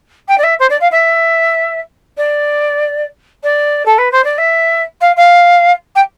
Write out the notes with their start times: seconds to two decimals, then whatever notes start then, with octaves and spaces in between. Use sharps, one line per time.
0.28 G5
0.37 D5
0.43 E5
0.59 C5
0.69 D5
0.80 F5
0.91 E5
2.17 D5
3.43 D5
3.85 A4
3.98 B4
4.11 C5
4.24 D5
4.37 E5
5.00 F5
5.16 F5
5.95 G5